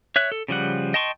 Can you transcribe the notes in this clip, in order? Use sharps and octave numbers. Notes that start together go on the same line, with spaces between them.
C#5 E5 F#6
A4
C#3 F3 G3 F#5
D#5 G5 A5 C6 C#6